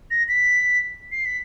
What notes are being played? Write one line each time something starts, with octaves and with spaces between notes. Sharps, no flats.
A#6
B6
C7
B6